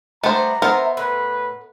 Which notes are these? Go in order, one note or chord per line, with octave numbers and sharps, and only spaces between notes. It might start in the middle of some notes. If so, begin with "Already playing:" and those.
G3 A3 B3 D4 C5 A#5
B3 A#4 C5 E5
A2 B4